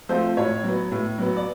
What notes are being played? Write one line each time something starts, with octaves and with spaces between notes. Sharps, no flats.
F3 A3 C4 C5
A2 C#5
F#3 B3
A2
F#3 B3
D5